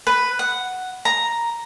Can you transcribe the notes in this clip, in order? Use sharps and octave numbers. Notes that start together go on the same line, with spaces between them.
B4
F#5
A#5